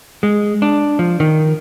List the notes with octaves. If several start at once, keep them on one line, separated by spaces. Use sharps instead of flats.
G#3
D4
F3
D#3